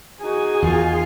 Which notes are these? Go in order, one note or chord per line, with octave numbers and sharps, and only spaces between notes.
D#4 F#4 G#4 G#5
E2 D#3 F4